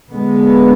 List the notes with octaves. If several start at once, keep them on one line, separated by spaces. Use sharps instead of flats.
D3 G#3 B3